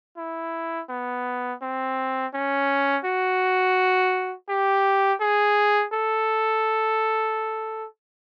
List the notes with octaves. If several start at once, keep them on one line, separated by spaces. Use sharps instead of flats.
E4
B3
C4
C#4
F#4
G4
G#4
A4